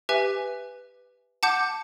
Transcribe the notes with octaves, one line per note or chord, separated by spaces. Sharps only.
G4 B4 E5 G#5
F#5 A5 D6 G6